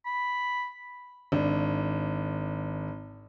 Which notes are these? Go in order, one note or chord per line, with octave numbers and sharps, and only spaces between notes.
B5
G#1 D4